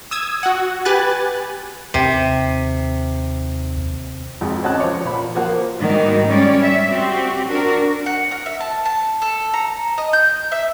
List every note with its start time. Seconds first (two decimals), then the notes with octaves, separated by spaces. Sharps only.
0.11 D#6 E6 G#6
0.43 F#4 F#5
0.85 G4 B4 G#5 F#6 A6
1.94 D#2 C3
4.41 G#1 F2
4.63 C4 C#4 F#4 D#5 A5 F#6
4.78 F3 C#5 D6
5.05 A#2 B5
5.35 F3 A#3 F#4
5.79 G#2 D#3 G3 A#3 F#4
6.26 G3 G#3 C#4 C#5 D5
6.61 E5
6.92 C4 F#4 G4
7.48 D4 F#4 A#4
8.06 F#5
8.31 A#4
8.46 E5
8.60 A5
8.85 A5
9.22 A4
9.54 A#5
9.98 D#5
10.13 G6
10.52 E5